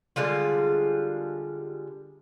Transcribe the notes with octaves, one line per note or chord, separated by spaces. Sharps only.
D3 G3 G#3 F4